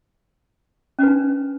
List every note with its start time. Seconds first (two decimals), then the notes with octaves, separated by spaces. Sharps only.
0.99 C#4
1.03 B4
1.08 D4